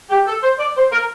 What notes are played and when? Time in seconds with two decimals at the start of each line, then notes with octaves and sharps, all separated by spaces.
0.10 G4
0.27 A4
0.42 C5
0.59 D5
0.76 C5
0.92 A#4